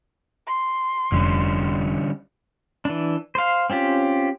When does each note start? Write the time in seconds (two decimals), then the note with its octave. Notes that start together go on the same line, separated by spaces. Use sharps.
0.47 C6
1.12 F1 D3 G3 C#4
2.85 E3 D4
3.35 C5 F5
3.70 C4 C#4 F4 G4